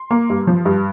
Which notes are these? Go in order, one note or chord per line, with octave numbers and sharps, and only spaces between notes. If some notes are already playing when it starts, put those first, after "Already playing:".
Already playing: C6
A#3
G2
F3
G2